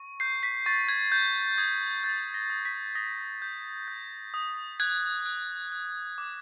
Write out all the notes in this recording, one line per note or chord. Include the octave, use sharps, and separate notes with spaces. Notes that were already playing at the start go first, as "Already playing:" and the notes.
Already playing: C#6
G6 C7
B6
C#6 A6
G#6
G6
D#6 G#6
G6 A6
A#6
D#6
B6
D#6 A#6
G6
G6
D#6
F#6 G#6
F#6
F#6
D6